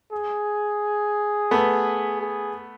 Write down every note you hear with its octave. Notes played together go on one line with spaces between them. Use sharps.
G#4
A3 B3
G#4